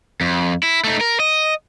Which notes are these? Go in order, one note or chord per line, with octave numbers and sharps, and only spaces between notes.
F2
E4
A3 D#4
A#4
D#5